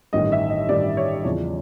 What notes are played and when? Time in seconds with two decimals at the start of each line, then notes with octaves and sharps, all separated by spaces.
0.13 A1 G2 D#3 G3 D#5
0.32 E5
0.50 D#5
0.69 A1 G2 D#3 G3 D5
0.97 C#5
1.24 E2 C#3 F3